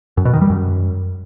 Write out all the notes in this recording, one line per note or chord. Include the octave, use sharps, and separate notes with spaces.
F#2
B2
D#3
G3
F#2